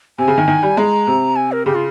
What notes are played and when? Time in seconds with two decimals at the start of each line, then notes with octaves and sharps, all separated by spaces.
0.18 C3 G#5
0.28 C#3
0.38 D#3
0.48 D#3
0.63 G3
0.77 G#3 A#5
1.07 C3
1.36 G#5
1.52 A#4
1.66 C#3 G4
1.75 F4